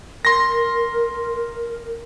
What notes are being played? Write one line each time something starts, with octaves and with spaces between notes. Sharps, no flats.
A#4 C6 A#6